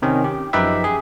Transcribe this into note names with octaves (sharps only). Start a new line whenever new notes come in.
C3 D#3 C4 C#4
G4
F#2 F3 D#4 G4 B4 E5
G#4